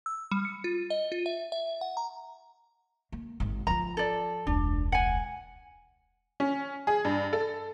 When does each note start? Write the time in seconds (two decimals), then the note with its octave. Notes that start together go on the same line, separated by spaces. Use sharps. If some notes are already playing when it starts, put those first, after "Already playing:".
0.06 E6
0.31 G3
0.45 C#7
0.64 F4
0.90 D#5
1.12 F4
1.26 E5
1.52 E5
1.81 F#5
1.97 A#5
3.12 A#3
3.40 G#1 C3
3.67 F3 F4 A#5
3.97 A4 D5
4.47 E1 C#2 D4
4.92 F#5 G#5
6.40 C#4
6.87 G#4
7.05 G2
7.33 A4